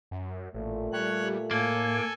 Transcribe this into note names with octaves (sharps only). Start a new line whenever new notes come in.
F#2
A1 A#2 A3
G3 C#5 F#6
A2 A#3 A4 G#5